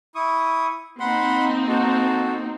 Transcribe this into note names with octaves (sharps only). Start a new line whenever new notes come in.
E4 C#6 D#6
A#3 C4 D#4 F#5 B5 C6
F#4 A4